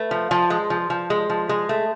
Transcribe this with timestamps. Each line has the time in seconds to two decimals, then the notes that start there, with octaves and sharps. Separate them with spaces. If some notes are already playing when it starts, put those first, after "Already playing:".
Already playing: A3 B4
0.11 F3
0.31 F3
0.50 G#3
0.70 F3
0.90 F3
1.10 G#3
1.30 F3
1.49 G#3
1.69 A3